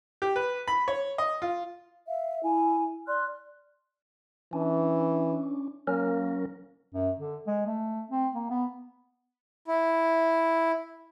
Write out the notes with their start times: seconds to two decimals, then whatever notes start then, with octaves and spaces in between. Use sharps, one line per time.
0.22 G4
0.36 B4
0.68 B5
0.88 C#5
1.18 D#5
1.42 F4
2.06 E5 F5
2.43 E4 G#5
3.07 D5 C6 F6 F#6
4.53 E3 C#4 D4
5.87 F#3 A#3 C#4 A#4
6.94 F#2
7.19 D3
7.47 G#3
7.66 A3
8.11 C4
8.35 A#3
8.51 B3
9.68 E4